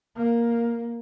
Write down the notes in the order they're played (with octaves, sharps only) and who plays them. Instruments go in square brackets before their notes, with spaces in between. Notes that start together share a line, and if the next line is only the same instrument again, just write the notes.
[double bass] A#3